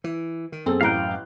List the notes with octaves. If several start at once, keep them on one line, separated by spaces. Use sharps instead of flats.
E3
D#3
F#2 C4 G#4 A4
A1 F5 G5 A#5 F#6